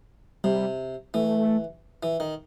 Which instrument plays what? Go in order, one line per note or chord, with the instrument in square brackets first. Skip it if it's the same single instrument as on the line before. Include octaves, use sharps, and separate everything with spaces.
[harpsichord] C3 [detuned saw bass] G3
[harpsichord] E3 [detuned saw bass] A3
[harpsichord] E3
D#3